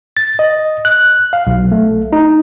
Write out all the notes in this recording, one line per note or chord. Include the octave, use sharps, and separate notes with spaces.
A6
D#5
F#6
F5
B1
A3
D#4